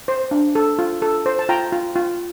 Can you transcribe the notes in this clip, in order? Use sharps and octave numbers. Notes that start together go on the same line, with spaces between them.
C5
D4
A4
F4
A4
C5
A5
F4 G5 A#5
F4
F4